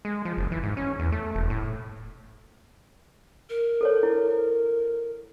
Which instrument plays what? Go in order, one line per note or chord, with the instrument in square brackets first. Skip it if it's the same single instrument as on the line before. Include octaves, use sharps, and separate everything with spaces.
[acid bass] G#3
F3
F#1
E3
G#2
C#4
E2
A3
E1
A2
[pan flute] A#4
[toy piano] A4 C5 C#5
E4